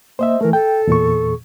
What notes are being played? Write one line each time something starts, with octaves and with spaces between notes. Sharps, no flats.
A#3 C5 D#5 E5
E3 A3 A#4
A4 G5
E2 A#2 C#6